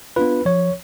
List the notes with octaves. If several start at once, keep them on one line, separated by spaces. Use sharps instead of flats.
B3 D4 F4 B4
F3 C#5